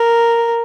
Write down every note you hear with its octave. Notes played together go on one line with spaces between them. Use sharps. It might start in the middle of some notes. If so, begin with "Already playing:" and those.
Already playing: A#4